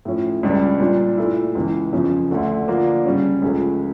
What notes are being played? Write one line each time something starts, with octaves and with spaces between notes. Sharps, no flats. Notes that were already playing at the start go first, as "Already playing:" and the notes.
A2 F3 C#4
C#2 C#3 G3 D4
A#2 G3 D4
A#2 A3 E4
C#2 C#3 E3
F2 C#3 F3 C#4
D2 D3 A3
D3 F3 A#3 D4
C#3 G3 C#4
C#2 C#3 F3 A3